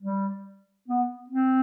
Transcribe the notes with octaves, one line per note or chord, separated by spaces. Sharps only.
G3
B3
C4